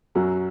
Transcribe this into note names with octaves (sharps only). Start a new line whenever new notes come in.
F#2 F#3 F#4